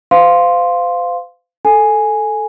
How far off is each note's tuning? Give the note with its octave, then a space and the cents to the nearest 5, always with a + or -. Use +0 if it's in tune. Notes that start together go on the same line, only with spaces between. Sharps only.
C5 -40 F5 +0 C6 +0
A4 +0 G#5 +0